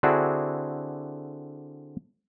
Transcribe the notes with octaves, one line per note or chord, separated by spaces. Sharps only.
D3 C4 D4 E4 F#4 G#4